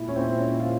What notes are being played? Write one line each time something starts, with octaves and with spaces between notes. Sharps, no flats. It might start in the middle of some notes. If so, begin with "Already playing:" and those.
Already playing: A#2 G#3 E4
C#4
C4
C#4
F4